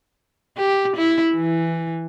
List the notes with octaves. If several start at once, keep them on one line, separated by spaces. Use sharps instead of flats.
G4
E4
E3